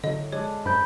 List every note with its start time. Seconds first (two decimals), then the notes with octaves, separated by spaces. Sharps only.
0.04 A2 D3 F#3 D#5
0.32 G#3 D4 A4 C#5
0.66 G2 C4 A#4 B5 G6